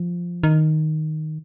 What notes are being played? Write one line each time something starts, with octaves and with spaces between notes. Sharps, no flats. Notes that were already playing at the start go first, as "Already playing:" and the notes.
Already playing: F3
D#3